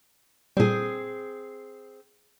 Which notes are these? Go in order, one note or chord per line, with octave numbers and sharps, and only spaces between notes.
A#2 G3 C4 G#4